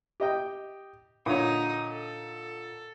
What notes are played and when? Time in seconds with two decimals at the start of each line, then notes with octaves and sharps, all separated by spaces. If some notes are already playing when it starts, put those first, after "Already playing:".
0.20 G4 D#5 G5
1.26 A#2 D3 D#4 C#5 D#6
1.92 A4